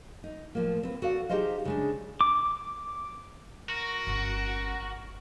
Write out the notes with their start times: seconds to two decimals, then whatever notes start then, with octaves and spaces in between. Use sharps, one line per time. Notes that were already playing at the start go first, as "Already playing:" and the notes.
0.24 D#4
0.55 A2 F3 A#3
0.83 C4 B4
1.02 F#4 A4 D5 F5 F#5
1.29 D#4 G4 G#4 C5 D#5 F5
1.65 C#3 G#3 D4
2.21 D6
3.69 F#4 A#4
4.07 G1 C#4